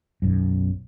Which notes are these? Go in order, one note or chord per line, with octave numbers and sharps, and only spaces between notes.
B1 F#2